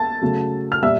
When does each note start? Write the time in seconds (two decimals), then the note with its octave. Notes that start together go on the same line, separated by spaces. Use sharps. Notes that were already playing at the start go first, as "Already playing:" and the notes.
Already playing: A5 A6
0.21 C#3 F#3 A3
0.72 F6
0.82 A#2 G3 E5 E6